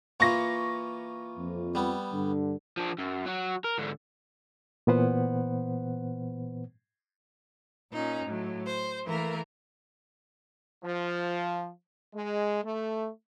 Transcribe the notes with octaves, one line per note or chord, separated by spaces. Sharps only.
E3 A#3 F4 C#6 A#6
F2
G3 B3
G2 D3
F3 D4
F#2
F#3 F#4
A#4
G#2 D3
A#2 E3 B3 B4 C5 F#5
A#2 C#4 D#4
A2 F#3
C5
E3 A3 A#3 A#4
F3
G#3
A3